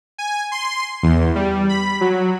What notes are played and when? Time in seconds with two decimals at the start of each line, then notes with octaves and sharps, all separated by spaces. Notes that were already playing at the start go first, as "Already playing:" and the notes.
0.18 G#5
0.52 C6
1.03 E2
1.35 G3
1.69 B5
2.01 F#3